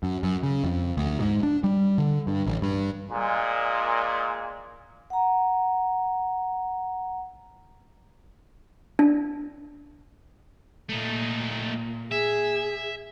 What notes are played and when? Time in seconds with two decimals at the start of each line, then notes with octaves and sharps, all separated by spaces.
0.03 F#2
0.23 F#2
0.43 C#3
0.64 F2
0.97 D2
1.20 G#2
1.43 D4
1.64 G3
1.98 D3
2.27 G2
2.47 A1
2.62 G2
3.11 A#2 G#3
5.10 F#5 A#5
8.99 D4
10.90 A#2 A3 D#4
12.12 G#4 E5